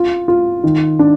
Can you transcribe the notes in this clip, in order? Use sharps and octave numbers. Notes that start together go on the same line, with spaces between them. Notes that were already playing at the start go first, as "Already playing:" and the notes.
Already playing: F4
F4
D#3
D4